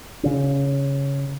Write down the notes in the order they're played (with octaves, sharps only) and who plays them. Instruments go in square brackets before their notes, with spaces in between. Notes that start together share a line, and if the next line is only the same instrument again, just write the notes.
[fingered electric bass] C#3 C#4